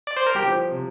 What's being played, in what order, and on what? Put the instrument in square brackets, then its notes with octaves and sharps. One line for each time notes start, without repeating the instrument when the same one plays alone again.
[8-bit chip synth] D5
C5
A#4
[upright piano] G3 [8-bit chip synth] G4
[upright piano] F3
C3